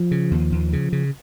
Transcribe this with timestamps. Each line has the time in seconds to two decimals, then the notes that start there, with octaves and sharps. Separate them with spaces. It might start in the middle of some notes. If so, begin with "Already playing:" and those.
Already playing: F3
0.11 C#3
0.31 D#2
0.52 D#2
0.73 C#3
0.93 C#3